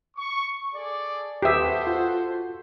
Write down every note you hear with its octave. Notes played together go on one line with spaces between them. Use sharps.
C#6
G#4 A4 D5
D#2 F#4 G4 A4 B4 C5 E5 D#6
F4 F#5